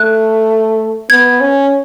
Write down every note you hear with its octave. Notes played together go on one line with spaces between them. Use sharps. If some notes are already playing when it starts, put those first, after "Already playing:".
Already playing: A3 F#6
B3 G#6
C#4